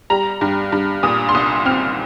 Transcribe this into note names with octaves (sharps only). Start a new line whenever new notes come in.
G3 A#5
G2
G2
A#2 D#6
C6
C2 D#6
C4 F6